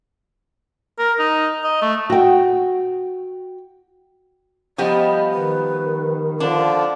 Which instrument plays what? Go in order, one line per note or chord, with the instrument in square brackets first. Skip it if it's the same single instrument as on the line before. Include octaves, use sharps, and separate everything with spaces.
[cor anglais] A#4
D#4
D#5
A3
[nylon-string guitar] F#4 G5
[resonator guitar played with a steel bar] F3 G3 B3 [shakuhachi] D#5
[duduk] D#3 [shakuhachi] B4
[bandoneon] D3 F3 [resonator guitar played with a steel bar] D4 [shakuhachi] F4